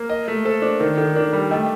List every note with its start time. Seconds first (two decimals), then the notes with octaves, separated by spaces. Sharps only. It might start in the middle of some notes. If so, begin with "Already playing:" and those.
Already playing: A#3
0.09 A#4 D#5
0.28 A3
0.45 A4 C5
0.62 D4 C5
0.80 D#3 A#4
0.97 D#3 A4
1.15 D4 A#4
1.33 G3 A#4
1.51 A3 D#5 G5